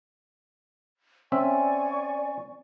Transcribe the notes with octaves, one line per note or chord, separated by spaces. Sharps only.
C4 C#4 D5 E5 G#5 C#6